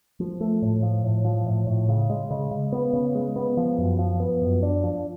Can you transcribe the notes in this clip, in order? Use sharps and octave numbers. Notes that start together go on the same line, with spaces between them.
F3
A3
A2
F3
A2
F3
A2
A2
C#3
G#3
C#3
C#3
B3
C#3
G#3
B3
F3
F#2
F3
B3
F#2
D4
F3